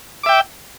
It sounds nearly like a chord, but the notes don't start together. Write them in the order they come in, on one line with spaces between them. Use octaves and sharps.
D6 E5 G5